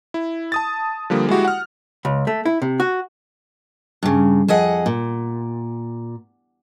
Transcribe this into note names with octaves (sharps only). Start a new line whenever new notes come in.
E4
A5 D#6 A6
D3 F3 G3 A#3
G#3 E4 F#4 G4
F#5 F6
C#2
A3
E4
C3
F#4
G2 C#3
F2 G#4 D#5 F#5
A#2